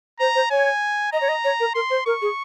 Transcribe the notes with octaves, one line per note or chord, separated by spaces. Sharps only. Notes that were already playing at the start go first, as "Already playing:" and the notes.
C5 A#5
C5
C#5 G#5
D#5 A#5
C#5
D#5
C#5
A#4
A#4 C6
C5
A#4 C#6
G#4